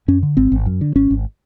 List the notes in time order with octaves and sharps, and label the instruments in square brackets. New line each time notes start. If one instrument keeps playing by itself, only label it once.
[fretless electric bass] F#2 C#4
D3
G#1 C4
G#1
F#2
D3
G#1 C#4
G#1